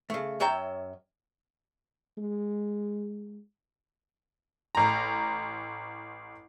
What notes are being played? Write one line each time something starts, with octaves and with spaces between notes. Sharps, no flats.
C#3 A3
F#2 C#5 E5 G5 A#5
G#3
A1 A#5